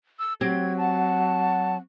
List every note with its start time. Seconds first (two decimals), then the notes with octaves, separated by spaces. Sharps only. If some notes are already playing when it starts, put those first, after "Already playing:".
0.19 E6
0.41 F#3 C4 G4 G#6
0.77 F#5 A5